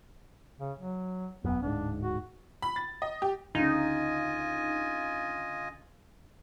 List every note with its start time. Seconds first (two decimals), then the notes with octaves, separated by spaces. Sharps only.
0.60 C#3
0.80 F#3
1.45 E1 F#2 B3
1.62 D1 G#2 D4
2.02 F#4
2.62 B5
2.76 A6
3.02 D#5
3.22 G4
3.55 D2 C#3 D#4 F4 D#5 G#5